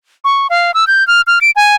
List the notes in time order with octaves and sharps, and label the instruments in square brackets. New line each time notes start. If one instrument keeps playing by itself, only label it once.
[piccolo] C#6
F5
E6
G6
F6
F6
D7
G#5